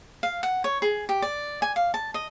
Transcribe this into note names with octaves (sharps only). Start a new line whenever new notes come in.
F5
F#5
C#5
G#4
G4
D5
G#5
F5
A5
D#5